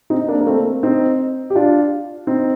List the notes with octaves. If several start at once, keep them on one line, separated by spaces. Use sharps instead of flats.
C4 D#4
A#3 D4
A#3
A3 C4
C4 D#4
G4
D4 F4
C4 D#4